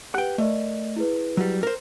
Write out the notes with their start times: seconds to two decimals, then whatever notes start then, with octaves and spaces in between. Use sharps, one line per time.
0.14 G4 B4 F#5 G5
0.38 A3 A#4 D5 D#5
0.96 E4 G#4 B4
1.37 F#3 G3
1.63 A#4 C5